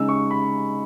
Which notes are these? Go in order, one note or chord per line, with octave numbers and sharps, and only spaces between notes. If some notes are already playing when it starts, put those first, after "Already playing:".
Already playing: C#3 G#3 D#4 E6
C#6
B5